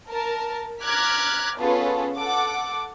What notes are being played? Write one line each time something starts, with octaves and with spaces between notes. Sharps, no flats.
A#4 A5
A#5 D6 F6 F#6 G#6 B6
B3 C#4 F4 G#4 A4 B4
A4 F#5 D6